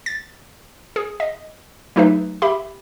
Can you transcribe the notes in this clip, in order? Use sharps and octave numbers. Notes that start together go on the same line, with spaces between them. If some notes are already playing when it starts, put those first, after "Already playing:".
A6
G#4
D#5
F#3 A3 D#4 G#4 B4 E5
G4 E5 B5